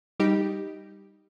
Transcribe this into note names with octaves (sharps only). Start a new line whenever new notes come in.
G3 D#4 G4